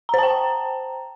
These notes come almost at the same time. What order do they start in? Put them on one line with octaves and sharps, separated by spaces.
A#5 C5 A5 G5